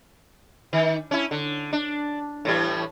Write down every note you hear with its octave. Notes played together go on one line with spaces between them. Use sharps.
D#3
C#4 E4
D3
D4
A2 E3 G3